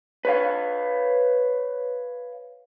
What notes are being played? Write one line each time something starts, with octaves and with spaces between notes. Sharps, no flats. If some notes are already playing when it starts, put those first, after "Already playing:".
B4 C#5 F5